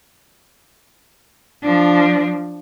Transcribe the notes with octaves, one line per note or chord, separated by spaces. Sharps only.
F3 D4